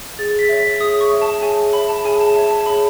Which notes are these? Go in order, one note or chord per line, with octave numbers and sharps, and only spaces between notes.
G#4 A6
B6
C#5 E5
B6
G#4 D#6
C#6
C#5 E5
A5
G#4 G#5
C#5 E5 B5
A5
G#4 G#5
A5
C#5 E5 A5
A5
G#4 B5